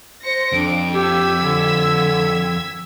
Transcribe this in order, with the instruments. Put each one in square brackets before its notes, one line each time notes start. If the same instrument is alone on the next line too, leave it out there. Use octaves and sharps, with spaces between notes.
[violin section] C5 A#6 C#7
[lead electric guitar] F2 [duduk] D4 [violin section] D7
[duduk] G4 [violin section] E6 G#6 B6
[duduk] D3